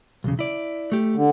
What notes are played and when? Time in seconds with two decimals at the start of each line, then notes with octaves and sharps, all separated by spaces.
0.24 B1 E2 C#3
0.39 E4 D5
0.92 A3 G4
1.15 D3